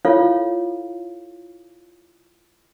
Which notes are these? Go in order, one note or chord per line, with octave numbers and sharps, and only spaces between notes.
E4 F4 A4 C#5 F5